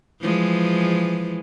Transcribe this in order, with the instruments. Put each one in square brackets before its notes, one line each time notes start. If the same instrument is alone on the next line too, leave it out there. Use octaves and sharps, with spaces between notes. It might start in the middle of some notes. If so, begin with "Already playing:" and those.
[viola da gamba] E3 F3 G#3